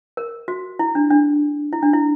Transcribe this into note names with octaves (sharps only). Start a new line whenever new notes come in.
A#4
F#4
E4
D4
D4
E4
D4
E4